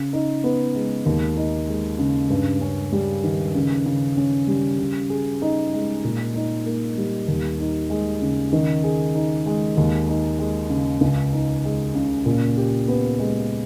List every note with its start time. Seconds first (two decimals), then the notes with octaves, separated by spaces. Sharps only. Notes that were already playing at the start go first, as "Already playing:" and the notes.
Already playing: C#3
0.13 D#4
0.44 B3
0.75 G#3
1.06 D#2
1.37 D#4
1.68 G#3
1.99 C#3
2.30 G2
2.62 C#4
2.92 G3
3.23 D#3
3.55 C#3
3.86 C#3
4.17 C#4
4.48 G3
4.79 C#3
5.10 G#4
5.42 D#4
5.73 G#3
6.04 A#2
6.35 D#4
6.66 A#3
6.97 G3
7.28 D#2
7.60 D#4
7.90 G#3
8.22 C#3
8.53 D#3
8.84 G#4
9.15 D#4
9.46 G#3
9.77 D#2
10.08 D#4
10.39 G#3
10.70 C#3
11.01 C#2
11.33 D#4
11.64 G#3
11.95 C#3
12.26 A#2
12.57 G4
12.88 B3
13.19 G#3